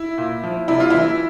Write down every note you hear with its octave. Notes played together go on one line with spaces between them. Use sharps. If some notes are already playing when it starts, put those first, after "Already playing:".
Already playing: E4
A#2
F3
C3 E4
F4
E3 E4